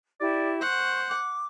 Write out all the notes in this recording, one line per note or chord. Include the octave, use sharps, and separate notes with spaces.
E4 G4 D5
C5 F#5 C#6
D6